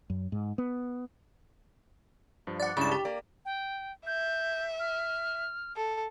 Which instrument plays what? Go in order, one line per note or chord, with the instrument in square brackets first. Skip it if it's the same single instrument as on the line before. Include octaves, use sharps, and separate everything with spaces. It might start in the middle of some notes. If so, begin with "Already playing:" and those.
[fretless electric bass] F#2
G#2
B3
[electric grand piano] G2 F3
[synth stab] D5 F#5
[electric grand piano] C#2 G2 E4 [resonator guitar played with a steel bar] C#3 [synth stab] D5 A5
[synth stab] G4 [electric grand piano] B6
[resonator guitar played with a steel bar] A#3 [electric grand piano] D5
[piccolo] G5
[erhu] E5 [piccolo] G6
[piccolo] F6
[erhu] A4